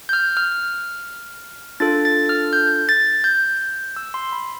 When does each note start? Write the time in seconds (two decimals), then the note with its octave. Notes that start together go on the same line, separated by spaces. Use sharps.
0.09 G6
0.13 F6
0.37 F6
1.80 D4 F4 A4 A6
2.05 A6
2.29 F6
2.53 G6
2.89 A6
3.24 G6
3.96 E6
4.14 C6
4.32 B5